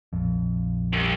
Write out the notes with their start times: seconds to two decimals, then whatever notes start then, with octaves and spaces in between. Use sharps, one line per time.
0.13 A#1 F2
0.93 C2